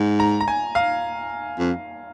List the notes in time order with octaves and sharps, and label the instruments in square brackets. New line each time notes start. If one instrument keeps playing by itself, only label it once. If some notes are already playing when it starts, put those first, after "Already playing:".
Already playing: [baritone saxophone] G#2
[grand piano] A#5
A#5
G#5
F5
[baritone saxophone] F2